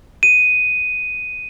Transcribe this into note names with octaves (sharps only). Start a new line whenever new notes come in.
D#7